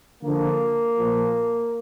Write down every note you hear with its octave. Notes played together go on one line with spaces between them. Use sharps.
D3 F3 A#3
A#2 F3